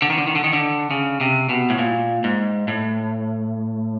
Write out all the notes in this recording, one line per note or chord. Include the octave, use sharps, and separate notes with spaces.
D3
D#3
D3
D#3
D3
D#3
D3
C#3
C3
B2
A2
A#2
G#2
A2